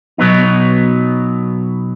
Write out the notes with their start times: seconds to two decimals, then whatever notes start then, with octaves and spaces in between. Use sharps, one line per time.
0.18 B2 F#3 B3 D#4